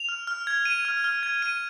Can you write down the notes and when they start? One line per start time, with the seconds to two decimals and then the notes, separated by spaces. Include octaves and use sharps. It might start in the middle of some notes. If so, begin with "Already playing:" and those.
Already playing: F7
0.09 F6
0.27 F6
0.47 G#6
0.65 D#7
0.85 F6
1.04 F6
1.23 G#6
1.42 D#7